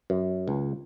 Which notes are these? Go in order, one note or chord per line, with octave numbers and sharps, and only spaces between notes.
F#2
C#2